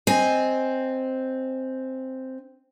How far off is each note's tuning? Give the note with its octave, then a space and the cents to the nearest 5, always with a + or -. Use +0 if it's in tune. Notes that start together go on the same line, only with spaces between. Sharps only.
C4 +0 D#5 +0 G#5 +0